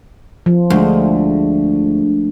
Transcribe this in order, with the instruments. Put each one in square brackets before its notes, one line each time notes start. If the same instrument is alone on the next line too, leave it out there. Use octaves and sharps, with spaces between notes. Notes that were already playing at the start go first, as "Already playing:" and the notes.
[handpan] F3
[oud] D2 [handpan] G#3 A3